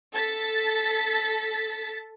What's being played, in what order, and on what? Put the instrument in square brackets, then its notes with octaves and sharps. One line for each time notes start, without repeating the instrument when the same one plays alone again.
[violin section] A4 A6 B6